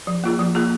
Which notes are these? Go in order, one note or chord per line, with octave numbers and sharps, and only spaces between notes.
F3
A#3 F4 G#4
F3
A#3 F4 G#4